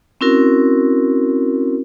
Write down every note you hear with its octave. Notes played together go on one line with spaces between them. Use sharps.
C4 C#4 E4 F#4 A#4